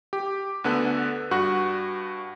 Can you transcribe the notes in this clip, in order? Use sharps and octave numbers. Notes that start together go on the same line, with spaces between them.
G4
D2 D3 B3 A4 F#6
G2 F#4 F#5 C#6 F#6